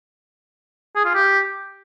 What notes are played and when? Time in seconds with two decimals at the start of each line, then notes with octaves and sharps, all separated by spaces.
0.96 G#4
1.05 F4
1.15 G4